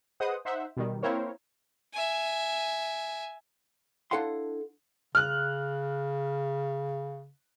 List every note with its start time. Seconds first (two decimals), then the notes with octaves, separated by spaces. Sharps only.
0.20 G#4 B4 C5 D#5 F#5 D#6
0.45 D#4 C5 E5 F#5
0.77 B2 D#3 G3
1.03 A#3 C4 E4 A#4 C5 C#5
1.94 E5 G#5
4.11 D4 E4 A4 F5 F#5 C6
5.15 C#3 F6 F#6